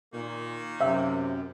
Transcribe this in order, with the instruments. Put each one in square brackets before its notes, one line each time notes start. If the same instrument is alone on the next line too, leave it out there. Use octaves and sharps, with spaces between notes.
[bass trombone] A#2 [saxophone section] D#3 A#3
[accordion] F#2 [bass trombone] C3 [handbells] E5 F5 E6